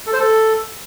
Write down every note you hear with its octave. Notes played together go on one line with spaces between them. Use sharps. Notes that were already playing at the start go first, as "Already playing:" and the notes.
A4
C5
A4